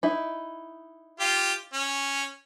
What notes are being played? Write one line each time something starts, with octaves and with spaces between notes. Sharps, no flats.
D#4 E4
F4 G4
C#4